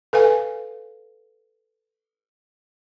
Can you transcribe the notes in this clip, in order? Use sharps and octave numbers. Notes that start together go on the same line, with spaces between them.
A4 B4 F5 G#5